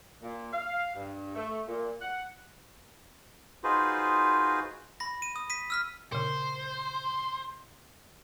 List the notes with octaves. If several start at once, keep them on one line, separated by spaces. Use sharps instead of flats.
A#2
F5
G2
A3
A#2
F#5
D#4 F4 F#4 G#4 B4 C5
B5 A#6
D#7
D#6
B6 D#7
E6 F6 B6
A#2 C#3 C5